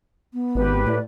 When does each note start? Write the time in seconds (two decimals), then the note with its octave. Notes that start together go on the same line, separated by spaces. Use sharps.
0.33 B3
0.55 G#1 G4 B4
0.87 A2 D5